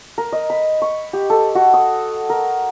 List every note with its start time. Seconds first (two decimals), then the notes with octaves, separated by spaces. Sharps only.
0.18 A#4
0.32 D#5
0.50 B5
0.82 C#6
1.13 G4
1.30 A4
1.55 F#4
1.74 D#6
2.30 A#4